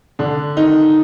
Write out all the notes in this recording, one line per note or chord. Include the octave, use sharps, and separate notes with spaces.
D3 D4
D#3 D#4